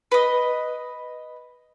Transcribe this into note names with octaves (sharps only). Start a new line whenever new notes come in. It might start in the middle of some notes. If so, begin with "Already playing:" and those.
B4 D#5